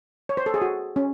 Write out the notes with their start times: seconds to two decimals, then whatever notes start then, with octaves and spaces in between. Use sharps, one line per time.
0.29 C#5
0.37 C5
0.46 A4
0.54 G#4
0.62 F#4
0.96 C#4